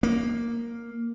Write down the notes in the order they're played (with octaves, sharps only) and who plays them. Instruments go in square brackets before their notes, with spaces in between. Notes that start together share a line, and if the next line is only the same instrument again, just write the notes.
[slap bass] A#3